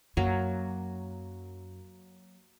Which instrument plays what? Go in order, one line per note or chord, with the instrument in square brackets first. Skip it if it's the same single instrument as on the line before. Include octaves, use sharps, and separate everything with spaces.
[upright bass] F#2 [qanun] F#3 A#3